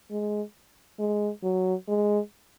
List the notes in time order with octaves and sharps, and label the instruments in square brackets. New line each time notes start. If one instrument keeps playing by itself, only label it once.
[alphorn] G#3
G#3
F#3
G#3